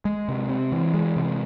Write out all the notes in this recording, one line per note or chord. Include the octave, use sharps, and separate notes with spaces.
G#3
C3
C4
E3
G#3
C3